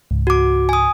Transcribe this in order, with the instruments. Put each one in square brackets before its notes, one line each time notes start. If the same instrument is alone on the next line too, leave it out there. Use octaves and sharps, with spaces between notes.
[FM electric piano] C#2 G#2
[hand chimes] F#4 D6
G#5 D#6